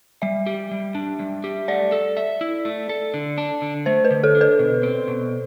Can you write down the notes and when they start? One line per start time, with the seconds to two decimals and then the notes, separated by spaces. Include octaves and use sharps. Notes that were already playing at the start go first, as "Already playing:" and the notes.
0.22 G3 E5
0.47 G4
0.72 G3
0.95 D4
1.20 G3
1.44 G4
1.68 A3 D5
1.92 A4
2.17 E5
2.41 E4
2.65 A3
2.89 A4
3.14 D3
3.38 D4
3.62 D3
3.86 A3 C5
4.05 B4
4.11 D3
4.23 A4
4.35 D4
4.41 B4
4.59 B2
4.83 C4
5.08 B2